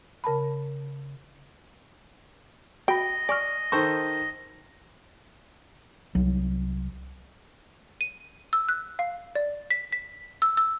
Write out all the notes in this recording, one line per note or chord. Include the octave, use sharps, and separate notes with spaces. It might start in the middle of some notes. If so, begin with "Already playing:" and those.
C#3 A#4 A5 B5
F#4 D#5 G5 B5
D5 G#5 C#6 F6
D#3 A4 C5 C#6
C2 F#3
D#7
E6
F#6
F5
D5
B6
B6
E6
E6